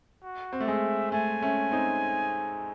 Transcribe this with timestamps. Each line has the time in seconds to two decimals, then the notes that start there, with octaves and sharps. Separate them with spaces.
0.24 F#4
0.53 C4
0.60 A3
0.67 G#3 E5
1.12 A3 G#5
1.42 A3 C#4
1.72 C4 D#4